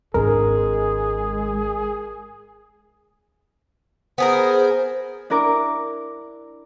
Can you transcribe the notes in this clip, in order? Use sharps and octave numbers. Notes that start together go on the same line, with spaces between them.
G#1 G#3 D4 G#4 A#4
B3 G#4 A#4 C5
D4 E4 A#4 D6